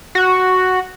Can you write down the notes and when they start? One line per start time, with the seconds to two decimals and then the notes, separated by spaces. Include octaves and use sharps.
0.15 F#4